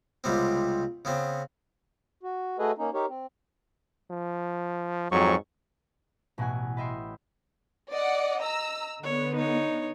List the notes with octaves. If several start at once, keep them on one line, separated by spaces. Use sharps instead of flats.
C#2 C3 G3 B3 C4
C#3 B3 C4
F#4
A3 F#4 G#4 A4 B4 D#5
A#3 C#4 D#4
D#4 G4 A#4 C#5
C4
F3
F2 G#2 F#3 C#6
A1 B2 E4 F#5 G#5
B4 D#5 E5 G5 C6
D5 D#5 F#5
A#5 E6
D3 B3 C#5
D#4 C#5